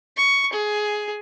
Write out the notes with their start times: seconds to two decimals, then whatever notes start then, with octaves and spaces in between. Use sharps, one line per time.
0.17 C#6
0.53 G#4